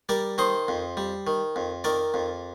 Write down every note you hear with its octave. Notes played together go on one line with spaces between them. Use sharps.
G3 A#4 D5
D#3 C5 D#5
F2
G3
D#3
F2
D#3 A#4 D5
F2